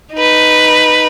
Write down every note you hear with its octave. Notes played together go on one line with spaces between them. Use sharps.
D#4 B4